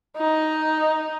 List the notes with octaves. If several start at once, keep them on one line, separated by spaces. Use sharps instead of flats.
D#4